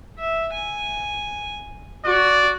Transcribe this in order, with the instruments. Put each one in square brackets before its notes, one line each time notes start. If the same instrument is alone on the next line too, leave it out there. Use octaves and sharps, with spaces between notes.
[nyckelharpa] E5
G#5
[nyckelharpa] F#4 C#6 [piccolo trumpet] D5